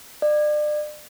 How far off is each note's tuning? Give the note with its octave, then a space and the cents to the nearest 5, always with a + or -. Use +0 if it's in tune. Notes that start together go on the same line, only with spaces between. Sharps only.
D5 +35